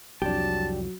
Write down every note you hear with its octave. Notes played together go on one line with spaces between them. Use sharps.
C2 F2 F#3 D4 G4 A5